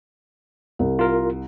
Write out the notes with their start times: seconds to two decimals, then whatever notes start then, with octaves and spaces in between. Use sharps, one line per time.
0.79 C2
0.99 F4 A#4